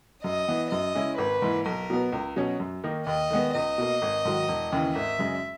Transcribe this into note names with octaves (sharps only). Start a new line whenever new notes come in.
F#2 D#5
E3 B3
F#2 D#5
C#3 G#3 C#4 E4
G#1 B4
G#2 E3 A#3
B1 A#4
B2 F#3 B3
C#2
B2 F#3 C#4
F#2
D#3 A#3 D#4
D#2 D#5
D#3 G#3 B3
C#2 D#5
B2 A#3
G#1
G#2 D#3 F#3
E1
D#2 C#3 E3
G#1 E5
F#2 C#3 G#3